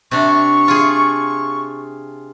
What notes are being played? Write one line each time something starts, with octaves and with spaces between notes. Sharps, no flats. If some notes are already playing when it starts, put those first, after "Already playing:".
C3 D4 C#6
F4 G#4